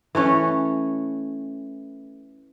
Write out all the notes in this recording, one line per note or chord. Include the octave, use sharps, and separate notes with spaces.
E3 A3 C#4